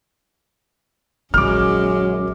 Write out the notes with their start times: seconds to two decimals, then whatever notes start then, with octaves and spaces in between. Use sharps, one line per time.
1.34 A#1 F#2 D#3 G#3 C#4 D6 F6